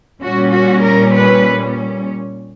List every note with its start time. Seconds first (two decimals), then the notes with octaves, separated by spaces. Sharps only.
0.21 A#2 G3 C#4 F#4
0.52 F#4
0.83 A#4
1.15 B4